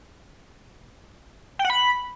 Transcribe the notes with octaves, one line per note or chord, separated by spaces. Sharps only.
G5
F#5
B5